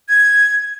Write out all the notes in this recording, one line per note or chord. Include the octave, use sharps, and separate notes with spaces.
G#6